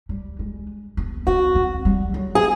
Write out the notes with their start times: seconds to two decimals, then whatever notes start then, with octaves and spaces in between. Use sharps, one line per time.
0.09 G3
0.39 G#3
0.97 B3
1.27 C4 F#4
1.55 C4
1.85 G3
2.14 F#3
2.35 G#4